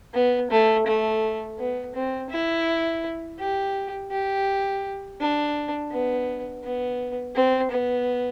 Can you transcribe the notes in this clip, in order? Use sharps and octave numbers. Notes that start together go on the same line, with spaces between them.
B3
A3
A3
B3
C4
E4
G4
G4
D4
B3
B3
C4
B3